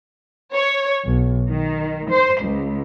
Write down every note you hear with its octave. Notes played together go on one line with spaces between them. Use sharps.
C#5
B1
D#3
C5
C#2